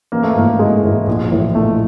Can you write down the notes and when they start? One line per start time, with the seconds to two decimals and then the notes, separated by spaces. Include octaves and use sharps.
0.12 A1 A#3
0.23 A3
0.34 G#2 E3 A#3
0.59 A1 G#3
0.84 G#2 E3
1.07 A#1
1.32 A2 E3
1.55 A#1 A3